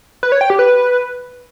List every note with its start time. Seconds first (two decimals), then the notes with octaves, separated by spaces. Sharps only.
0.23 B4
0.32 C#5
0.41 G5
0.50 G4
0.59 B4